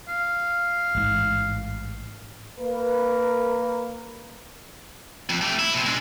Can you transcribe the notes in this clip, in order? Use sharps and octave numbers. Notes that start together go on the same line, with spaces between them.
F5
A1 G#2
A#3 A#4 B4
F2
A3 G4
E4
B2 C4
G#3 D4